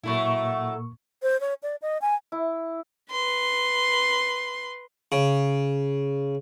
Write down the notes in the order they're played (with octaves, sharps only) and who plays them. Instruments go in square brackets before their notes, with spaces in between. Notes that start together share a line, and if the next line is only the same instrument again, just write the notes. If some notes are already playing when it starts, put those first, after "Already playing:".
[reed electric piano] A#2 A#3 C#6 [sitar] F#3 A3 E4
[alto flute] C5
C#5
D5
D#5
G#5
[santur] E4
[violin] B4 C6
[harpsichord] C#3